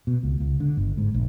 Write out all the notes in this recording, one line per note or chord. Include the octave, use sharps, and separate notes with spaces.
B2
C#2
C#2
D3
G1
G#2
A#1